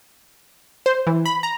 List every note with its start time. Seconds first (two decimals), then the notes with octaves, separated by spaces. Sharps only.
0.86 C5
1.07 E3
1.25 B5
1.43 A#5